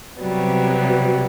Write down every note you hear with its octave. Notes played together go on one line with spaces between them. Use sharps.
C3 F#3 G3 B3